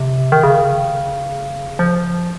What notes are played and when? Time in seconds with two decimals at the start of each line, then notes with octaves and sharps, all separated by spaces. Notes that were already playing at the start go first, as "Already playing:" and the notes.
Already playing: C3
0.32 D#3
0.43 C#3
1.79 F3